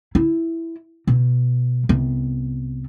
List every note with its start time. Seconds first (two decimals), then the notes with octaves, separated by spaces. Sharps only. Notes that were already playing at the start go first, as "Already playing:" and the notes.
0.15 E4
1.07 B2
1.89 C2 B3